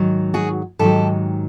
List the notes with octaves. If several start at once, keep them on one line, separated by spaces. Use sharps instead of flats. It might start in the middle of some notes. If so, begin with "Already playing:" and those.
Already playing: G#2 D#3 F#3
F#4 G#4
G#2 D#3 F#3 G4 A4